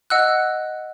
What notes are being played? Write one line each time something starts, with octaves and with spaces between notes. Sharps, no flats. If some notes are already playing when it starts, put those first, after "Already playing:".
D#5 F#5 E6 F#6